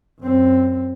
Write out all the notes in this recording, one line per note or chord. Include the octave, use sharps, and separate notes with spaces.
F#2 C4